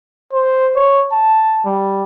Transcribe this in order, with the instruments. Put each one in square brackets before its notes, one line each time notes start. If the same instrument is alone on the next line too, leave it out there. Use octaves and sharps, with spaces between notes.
[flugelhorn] C5
C#5
A5
G3